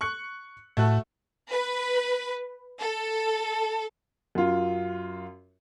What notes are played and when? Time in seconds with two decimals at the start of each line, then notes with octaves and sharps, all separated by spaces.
0.01 C#6 F#6 C#7
0.77 A2 A3 F#4 A4
1.50 B4
2.80 A4
4.35 F#2 F4